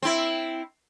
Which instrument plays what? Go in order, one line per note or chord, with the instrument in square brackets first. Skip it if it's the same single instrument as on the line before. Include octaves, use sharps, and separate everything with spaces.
[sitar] C4 E4